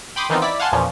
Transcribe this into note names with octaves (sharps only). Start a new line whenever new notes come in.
G5 B5 C6 D6 D#6
D#3 E3 B3 C4 D#4 F4
E4 D5 B6
F5 F#5 G#5 A5 C6
E2 A#2 F3 C#4